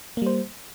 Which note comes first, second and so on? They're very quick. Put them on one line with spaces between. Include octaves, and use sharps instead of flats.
A#3 G3 C5